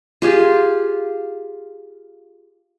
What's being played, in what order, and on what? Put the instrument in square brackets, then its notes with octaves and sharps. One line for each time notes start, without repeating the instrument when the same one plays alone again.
[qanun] F4 G4 G#4